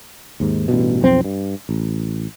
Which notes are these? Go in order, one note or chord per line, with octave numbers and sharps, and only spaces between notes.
D#2 G#2
A1 G2 B2
B1 F2 C4
G2
A1